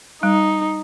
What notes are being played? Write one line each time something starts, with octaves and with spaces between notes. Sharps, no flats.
G3 D#4